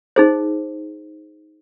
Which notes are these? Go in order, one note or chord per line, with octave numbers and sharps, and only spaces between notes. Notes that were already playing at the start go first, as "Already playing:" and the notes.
D#4 G#4 C5